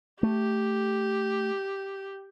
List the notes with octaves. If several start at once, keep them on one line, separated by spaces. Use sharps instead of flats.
A3 G4